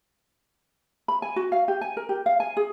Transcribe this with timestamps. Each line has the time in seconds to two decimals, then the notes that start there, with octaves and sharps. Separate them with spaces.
1.08 B5
1.22 G#5
1.36 F#4
1.52 F5
1.68 G4
1.81 G#5
1.97 A#4
2.09 G4
2.26 F5
2.40 G#5
2.57 G#4